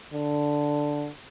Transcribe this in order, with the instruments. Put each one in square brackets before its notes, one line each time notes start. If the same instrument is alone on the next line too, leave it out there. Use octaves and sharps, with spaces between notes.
[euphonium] D3